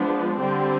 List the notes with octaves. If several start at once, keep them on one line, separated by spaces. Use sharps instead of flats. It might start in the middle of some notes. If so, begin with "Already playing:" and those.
Already playing: F3 G#3 B3 D4
D3 G3 C4